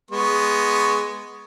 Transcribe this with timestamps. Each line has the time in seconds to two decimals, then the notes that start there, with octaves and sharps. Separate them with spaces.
0.11 G#3 B3 C#6